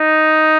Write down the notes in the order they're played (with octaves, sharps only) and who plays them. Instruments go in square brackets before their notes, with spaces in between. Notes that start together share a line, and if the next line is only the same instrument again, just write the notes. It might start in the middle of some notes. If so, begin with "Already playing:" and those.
Already playing: [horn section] D#4